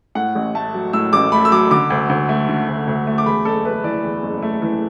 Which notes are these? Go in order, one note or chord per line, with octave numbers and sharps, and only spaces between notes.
A2 F#5
A1
A3 A5
F#3
A2 E6
A1 D6
A3 B5
E6
F#3 D6
D3 D6
D2
D2
A3
D3
D2
D2
A3
D6
E2 B5
F#1 A4
A3 B4
E3 D5
E2
F#1
A3
E3